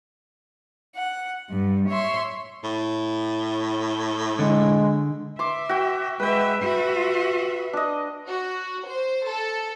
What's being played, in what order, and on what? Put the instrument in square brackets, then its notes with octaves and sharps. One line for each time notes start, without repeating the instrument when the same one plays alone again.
[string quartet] F#5
G2
C#5 E5 C6
[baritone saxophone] A2
[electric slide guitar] D3 [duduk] G#3
[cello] E5 [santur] C6 D6
[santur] F#4 G5
[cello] G#3 E5 [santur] B4 G5
[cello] F#4 E5
[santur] D4 D#5
[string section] F#4
C5
A4